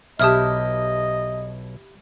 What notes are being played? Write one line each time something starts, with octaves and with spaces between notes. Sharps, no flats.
B1 B2 E4 G4 D#5 A5 D#6 F6